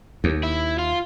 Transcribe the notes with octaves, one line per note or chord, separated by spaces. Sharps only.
D#2
E4
F4